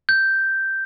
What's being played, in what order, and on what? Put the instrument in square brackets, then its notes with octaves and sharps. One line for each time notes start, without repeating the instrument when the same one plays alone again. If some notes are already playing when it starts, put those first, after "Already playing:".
[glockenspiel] G6